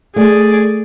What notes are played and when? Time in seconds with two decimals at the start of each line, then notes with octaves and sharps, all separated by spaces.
0.16 A3 G#4 D5